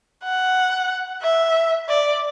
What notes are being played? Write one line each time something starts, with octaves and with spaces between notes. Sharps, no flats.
F#5
E5
D5